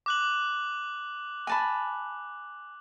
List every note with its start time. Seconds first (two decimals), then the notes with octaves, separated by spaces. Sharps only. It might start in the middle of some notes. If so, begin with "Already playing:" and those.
0.06 D6 F#6 F#7
1.47 G#5 A5 B5